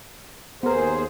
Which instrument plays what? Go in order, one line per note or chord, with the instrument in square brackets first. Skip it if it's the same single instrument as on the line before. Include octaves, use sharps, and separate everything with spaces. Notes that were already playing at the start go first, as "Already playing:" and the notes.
[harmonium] D#2 G#4 C5 [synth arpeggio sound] B3 A#4